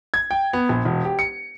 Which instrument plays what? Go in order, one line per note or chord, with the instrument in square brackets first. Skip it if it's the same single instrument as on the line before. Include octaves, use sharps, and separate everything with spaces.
[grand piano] G#6
G5
B3
A#1
E1
G4
C#7